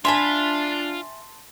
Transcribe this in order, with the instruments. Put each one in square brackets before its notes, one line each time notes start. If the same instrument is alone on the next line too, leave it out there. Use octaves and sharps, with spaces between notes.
[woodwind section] D4 [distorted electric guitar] F4 [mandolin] E5 G#5 B5 [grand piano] A5 C6